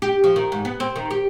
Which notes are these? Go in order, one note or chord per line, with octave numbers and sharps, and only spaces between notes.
G4
F3
D#3
G#2
B3
C4
D#3
G4